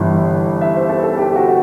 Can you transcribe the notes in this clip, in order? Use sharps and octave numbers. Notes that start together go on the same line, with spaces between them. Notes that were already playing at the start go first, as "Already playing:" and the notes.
Already playing: G1 G2 E3
E5
C5
A4
A4
G4
F#4